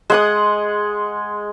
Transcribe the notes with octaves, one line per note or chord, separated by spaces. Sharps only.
G#3 F#5 D#6